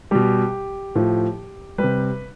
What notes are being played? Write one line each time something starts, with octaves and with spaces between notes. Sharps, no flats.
B2 G3 G4
A2 F3
G3 B4
C3